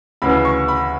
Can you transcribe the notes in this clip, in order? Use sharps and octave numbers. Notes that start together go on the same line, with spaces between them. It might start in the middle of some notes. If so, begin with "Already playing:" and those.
D2 C#3 E3 B5
C#6
B5